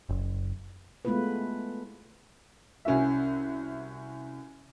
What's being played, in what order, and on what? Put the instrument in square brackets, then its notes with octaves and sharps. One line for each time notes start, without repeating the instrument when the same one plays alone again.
[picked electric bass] F#1
[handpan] G#3 A3 B3 E4 F4 B4
[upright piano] C2 C#4 F#4 E5